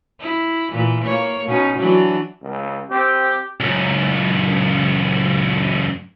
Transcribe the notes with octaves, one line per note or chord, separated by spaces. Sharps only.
E4
A#2 E3
A#3 C#5
B2 C#4 D#4
E3 F#3 D4
C#2
C4 G4
C#2 F#2